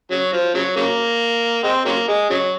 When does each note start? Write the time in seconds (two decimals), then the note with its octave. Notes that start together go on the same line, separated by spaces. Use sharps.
0.11 C#3 F#3
0.33 F3
0.54 C#3 F#3
0.77 C#3 F#3 A#3
1.64 G#3 C4
1.85 C#3 F#3 A#3
2.08 G#3
2.30 C#3 F#3